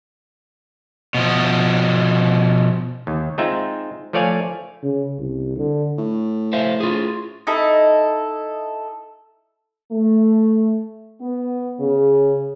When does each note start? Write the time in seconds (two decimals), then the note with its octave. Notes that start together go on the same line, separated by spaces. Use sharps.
1.14 B2 F3
3.07 D#2
3.38 G#3 C4 D#4 F4 E5 G5
4.13 F3 A3 C#5 D5 F5 G#5
4.83 C#3
5.18 C2
5.56 D3
5.98 A2
6.53 C5 E5 F5
6.80 F4 G#4
7.47 D#4 E4 A4
9.90 A3
11.19 B3
11.80 C#3